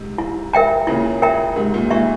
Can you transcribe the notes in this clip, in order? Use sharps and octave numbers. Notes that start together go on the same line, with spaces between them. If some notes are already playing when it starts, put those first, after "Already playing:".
Already playing: G#2 C3
E4
A#4 E5 G5 A#5
A#2 C#3 E4
A#4 E5 G5 A#5
G#2 C3 A#4
A#2
G#2
A#2 E5 A#5 C#6